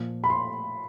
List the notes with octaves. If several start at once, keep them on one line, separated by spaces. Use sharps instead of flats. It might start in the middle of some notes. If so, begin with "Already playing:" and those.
Already playing: A#2 F3
B5
C6